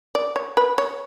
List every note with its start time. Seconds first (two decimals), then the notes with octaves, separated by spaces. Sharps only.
0.15 D5
0.36 C#5
0.57 B4
0.78 C#5